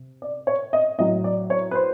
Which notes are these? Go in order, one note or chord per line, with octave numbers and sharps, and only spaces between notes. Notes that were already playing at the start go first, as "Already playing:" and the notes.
Already playing: C3
D5
C#5
D#5
A2 F#3 D#5
D5
C#5
B4
C5